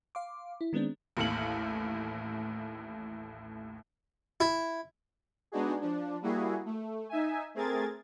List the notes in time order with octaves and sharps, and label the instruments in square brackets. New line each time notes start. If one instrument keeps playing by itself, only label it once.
[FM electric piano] F5 C6 D6
E4
D#3 G#3 B3 C4 D4
[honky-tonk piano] A1 D#2 A2 F5 C#7 F#7
[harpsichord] E4
[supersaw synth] G#3 B3 D4 D#4 F#4 G#4
F3 D4
G3 A#3 E4 F#4 G#4
A3
D#4 E5 G#5
A3 C4 G#4 A#4 G#6 A6